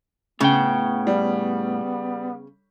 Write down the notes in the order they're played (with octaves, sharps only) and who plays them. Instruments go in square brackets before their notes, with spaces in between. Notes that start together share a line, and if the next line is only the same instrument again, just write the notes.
[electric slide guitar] A2 G5 [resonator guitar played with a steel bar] C#3 [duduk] B3
[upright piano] G3